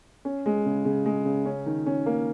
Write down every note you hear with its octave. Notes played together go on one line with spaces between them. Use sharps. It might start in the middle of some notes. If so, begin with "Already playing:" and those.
C#4
G#3
C#3
C#3
G#3
C#3
C#4
D#3
C#4
A#3